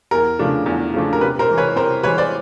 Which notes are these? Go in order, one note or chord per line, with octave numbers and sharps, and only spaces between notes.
E2 A#4
C#3 F3 A3 D4
E2
C#3 F3 A3 D4
A#4
C3 B4
A#4 C5
E3 G#3
B4 C#5
C3 A#4 C5
E3 G#3 B4 C#5
C5 D5